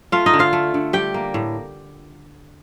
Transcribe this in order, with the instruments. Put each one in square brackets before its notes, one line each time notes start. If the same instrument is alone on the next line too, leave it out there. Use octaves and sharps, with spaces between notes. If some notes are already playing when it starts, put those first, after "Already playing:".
[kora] A3 F4 F5
D#4 D#5
D3
F4 F5
A3
D3
G3 G4 G5
A#3
A2